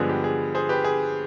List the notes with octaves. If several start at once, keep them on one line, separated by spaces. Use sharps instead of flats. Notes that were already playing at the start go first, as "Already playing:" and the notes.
Already playing: G2 D3 F3 G#3 B3 G#4
G4
G#4
G#4 C5
G4 B4
G#4